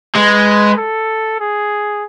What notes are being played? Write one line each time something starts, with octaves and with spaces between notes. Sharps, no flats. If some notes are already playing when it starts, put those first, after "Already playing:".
G#3 B4
A4
G#4